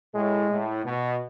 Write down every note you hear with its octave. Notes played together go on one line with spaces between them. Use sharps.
A2 G#3
A2
B2